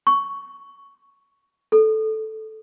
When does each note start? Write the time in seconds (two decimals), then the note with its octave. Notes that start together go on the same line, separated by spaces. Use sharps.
0.07 C#6
1.72 A4